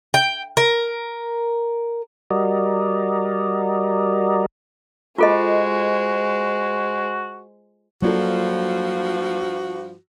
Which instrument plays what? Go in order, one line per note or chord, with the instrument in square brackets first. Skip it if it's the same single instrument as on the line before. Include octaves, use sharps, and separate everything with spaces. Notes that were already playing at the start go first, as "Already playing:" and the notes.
[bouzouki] G5
A#4
[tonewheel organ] G3 F#4 A#4 D5 D#5
[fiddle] G#3 C5 [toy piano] F4 A4 D#5 [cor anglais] F#4
[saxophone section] G2 F3 [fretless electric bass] F#3 A#3 [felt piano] D4 F4 A4 [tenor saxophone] F#4